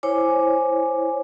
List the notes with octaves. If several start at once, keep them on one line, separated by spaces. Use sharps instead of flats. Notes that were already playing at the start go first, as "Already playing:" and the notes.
E4 C5 C#5 G#5 D6